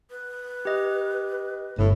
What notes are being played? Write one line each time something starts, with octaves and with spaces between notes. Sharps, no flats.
B4
G4 D#5
G1 A2